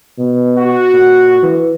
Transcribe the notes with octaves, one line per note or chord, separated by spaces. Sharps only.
B2
F#4
A#2
E3